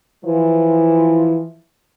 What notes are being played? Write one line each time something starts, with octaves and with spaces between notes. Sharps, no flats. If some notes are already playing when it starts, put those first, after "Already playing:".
E3 F3